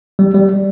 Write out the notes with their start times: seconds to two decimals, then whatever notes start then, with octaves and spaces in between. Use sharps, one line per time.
0.19 G3
0.34 G3